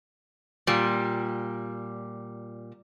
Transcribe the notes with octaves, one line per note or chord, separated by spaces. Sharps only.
A#2 G3